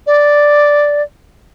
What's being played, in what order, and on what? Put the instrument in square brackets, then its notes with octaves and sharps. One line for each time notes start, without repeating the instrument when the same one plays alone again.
[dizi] D5